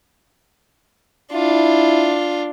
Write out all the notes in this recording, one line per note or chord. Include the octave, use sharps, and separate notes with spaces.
D4 E4 F4